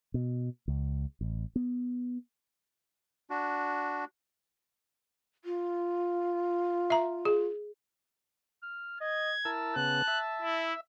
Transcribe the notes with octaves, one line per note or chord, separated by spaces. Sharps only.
B2
C#2
A1
B3
D4 F#4
F4
E5 A#5
G#4
F6
D#5 G#6
E4 A#4 A5 E6
C#3 B3 F#6
E5
E4